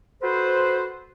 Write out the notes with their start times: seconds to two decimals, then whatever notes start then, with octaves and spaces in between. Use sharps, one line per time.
0.22 F#4 A4 B4 C5